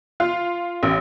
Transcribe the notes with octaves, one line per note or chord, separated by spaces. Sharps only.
F4
A1